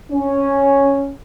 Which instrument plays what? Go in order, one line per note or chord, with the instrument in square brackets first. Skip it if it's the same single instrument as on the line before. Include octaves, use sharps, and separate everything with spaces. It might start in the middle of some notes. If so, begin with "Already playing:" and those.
[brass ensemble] C#4